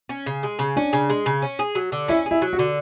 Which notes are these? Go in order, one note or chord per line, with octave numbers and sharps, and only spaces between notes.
C#4
C#3
G#3
C#3
C#4 D4
C#3
G#3
C#3
C#4
G#4
F#3
D3
C#4 E4
G#4
E4
F#3
F#4
D3